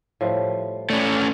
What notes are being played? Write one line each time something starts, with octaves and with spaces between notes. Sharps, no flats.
A2 F3 G3
A3 C#4 D4 A4 D5